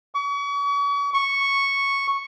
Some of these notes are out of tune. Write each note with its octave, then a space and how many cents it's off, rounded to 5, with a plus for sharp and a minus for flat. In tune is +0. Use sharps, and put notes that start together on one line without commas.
C#6 +40
C#6 -5